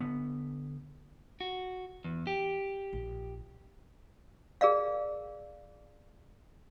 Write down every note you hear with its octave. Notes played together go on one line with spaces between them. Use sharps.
D3 B3
F#4
E2
G4
A#1
G#4 A#4 D5 F5